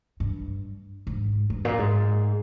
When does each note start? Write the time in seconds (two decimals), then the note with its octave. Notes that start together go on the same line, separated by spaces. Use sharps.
0.20 G2
1.07 G#2
1.50 G2
1.65 A#2
1.79 G#2